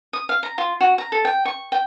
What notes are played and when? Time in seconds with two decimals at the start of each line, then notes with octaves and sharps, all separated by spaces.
0.13 D#6
0.29 F5
0.43 A#5
0.58 F4
0.81 F#4
0.98 A#5
1.12 A4
1.25 G5
1.45 C#6
1.72 G5